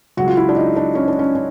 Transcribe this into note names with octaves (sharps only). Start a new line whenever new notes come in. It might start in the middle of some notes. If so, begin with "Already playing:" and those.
C#2 C#3 F#3 F#4
F4
E4
D4
D#4
D4
C#4
D4
C#4
C#4